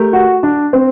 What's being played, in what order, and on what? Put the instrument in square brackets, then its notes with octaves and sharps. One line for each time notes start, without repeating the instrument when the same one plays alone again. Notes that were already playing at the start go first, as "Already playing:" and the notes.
Already playing: [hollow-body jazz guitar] A3 G4 A#4
[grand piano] F#4
D4
C4